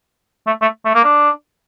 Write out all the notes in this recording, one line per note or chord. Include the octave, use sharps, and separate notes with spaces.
A3
A3
A3
A#3
D4